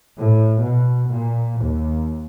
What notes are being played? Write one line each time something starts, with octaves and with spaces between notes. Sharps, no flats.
A2
B2
A#2
D#2